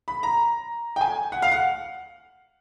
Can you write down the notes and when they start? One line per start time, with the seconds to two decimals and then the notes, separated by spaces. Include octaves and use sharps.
0.08 B5
0.23 A#5
0.96 G5
1.01 G#5
1.32 F#5
1.42 F5
1.52 F#5